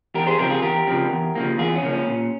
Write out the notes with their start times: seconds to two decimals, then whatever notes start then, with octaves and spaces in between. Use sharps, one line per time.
0.14 E2 G4 A#4
0.27 G#4 C5
0.38 C#3 F3 C4 G4 A#4
0.50 F4 G#4
0.62 E2 G4 A#4
0.87 C#3 F3 C4
1.11 E2
1.35 C#3 F3 A#3
1.58 E2 F4 G#4
1.75 C#4
1.83 C#3 F3 A#3
1.90 C#4
2.07 A#2